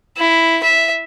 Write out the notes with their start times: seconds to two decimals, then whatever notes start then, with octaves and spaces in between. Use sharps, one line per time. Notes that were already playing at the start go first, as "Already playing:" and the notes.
0.17 E4
0.63 E5